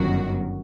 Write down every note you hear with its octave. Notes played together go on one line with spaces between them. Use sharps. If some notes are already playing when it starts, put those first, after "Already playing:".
Already playing: G1 F#2 D#3 F#4